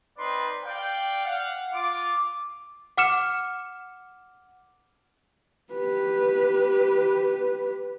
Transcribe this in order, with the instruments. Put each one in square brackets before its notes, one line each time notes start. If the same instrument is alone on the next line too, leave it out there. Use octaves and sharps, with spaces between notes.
[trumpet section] C4 D#4 B4 D5 C6
D5 F5 G5
F5 F#5
F4 D6
[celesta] F#5 D6 F6 C#7 E7
[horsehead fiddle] G4 B4